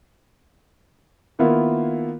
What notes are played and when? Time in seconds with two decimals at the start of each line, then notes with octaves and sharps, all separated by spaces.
1.39 D#3 A#3 B3 E4 F4